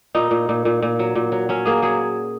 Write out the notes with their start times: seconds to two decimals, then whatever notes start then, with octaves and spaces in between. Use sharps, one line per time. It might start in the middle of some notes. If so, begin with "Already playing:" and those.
0.15 A#2 D#4
0.31 A#2
0.49 A#2
0.65 A#2
0.82 A#2
0.99 F#3
1.15 A#2
1.32 F#3
1.49 F#3 C#4
1.65 A#3 G#4
1.82 F#3 G#4